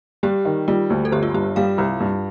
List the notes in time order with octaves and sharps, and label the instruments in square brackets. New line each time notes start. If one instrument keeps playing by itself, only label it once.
[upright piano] G3 [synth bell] G4
[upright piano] D#3
[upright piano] G3 [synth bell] F4
[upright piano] D2
[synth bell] A4
[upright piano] G1 [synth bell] G4
[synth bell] F4
[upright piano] G2 [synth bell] G4
[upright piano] G3 [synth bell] F5
[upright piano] C2
G2